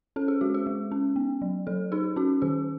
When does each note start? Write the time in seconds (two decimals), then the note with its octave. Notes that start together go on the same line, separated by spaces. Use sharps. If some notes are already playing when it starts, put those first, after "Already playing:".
0.16 C#4 A4
0.28 G#4
0.41 G#3 F#4
0.54 G#4
0.66 G#3
0.92 C#4
1.16 B3
1.42 F#3
1.67 F#3 A4
1.92 D#4 G#4
2.16 C#4 F#4
2.42 D#3 G#4